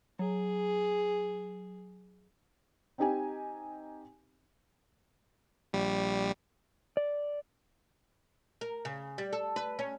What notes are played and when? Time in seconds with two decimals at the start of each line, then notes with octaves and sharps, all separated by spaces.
0.19 F#3 G#4
2.98 C4 D#4 G4 G#5
5.73 A#1 G3
6.97 D5
8.61 A#4
8.85 C#3
9.18 G3
9.33 A4
9.56 B4
9.79 C#4